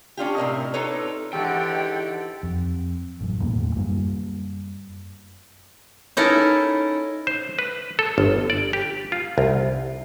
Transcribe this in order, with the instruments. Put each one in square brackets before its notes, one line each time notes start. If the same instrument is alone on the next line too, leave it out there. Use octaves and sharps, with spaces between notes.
[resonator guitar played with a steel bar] C#4 D4 F4 G4
A2 C3 A#4 D#5
D4 D#4 F4 A4 B4 C#5
[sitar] E2 G#2 D3 [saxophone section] G4 [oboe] A4 [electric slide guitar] G5
[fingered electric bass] F2
A1 F#2
B1 E2 A2 A#3
D2 A2
F#2 G3 A#3
[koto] C#4 D#4 E4 A4 A#4
[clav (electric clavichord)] C5
B4
A4
G1
D5
G4
F4
C2